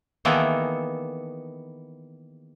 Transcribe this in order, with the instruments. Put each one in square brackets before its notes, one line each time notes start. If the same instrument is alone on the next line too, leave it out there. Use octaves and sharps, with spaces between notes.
[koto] D#3 E3 A#3 B3 G#4 A4